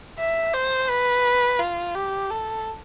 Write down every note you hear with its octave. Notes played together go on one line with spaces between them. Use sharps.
E5
C5
B4
F4
G4
A4